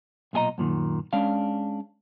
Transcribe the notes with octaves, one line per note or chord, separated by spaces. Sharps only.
B1 A#2 G#4 D#5 A#5
F#2 A#2 D#3
G#3 C#4 D4 F5